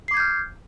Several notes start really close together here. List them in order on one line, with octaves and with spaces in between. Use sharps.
C7 D6 G#6 G6 F6